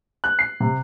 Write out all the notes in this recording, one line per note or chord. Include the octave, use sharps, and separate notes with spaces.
F#6
C7
C3